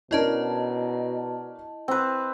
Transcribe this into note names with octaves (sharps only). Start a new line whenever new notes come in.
B2 C#4 D4 E4 A#4 D#5 A5
C4 B4